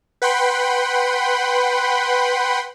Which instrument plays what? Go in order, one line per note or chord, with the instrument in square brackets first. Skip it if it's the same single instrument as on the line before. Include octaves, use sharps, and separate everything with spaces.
[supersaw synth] B4 F#5 G5 B5 C6